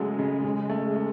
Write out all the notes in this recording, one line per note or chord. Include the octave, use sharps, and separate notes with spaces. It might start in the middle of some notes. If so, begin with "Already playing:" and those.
Already playing: C#3 F#3 G#3 A3
C#3
C#3
A3
A3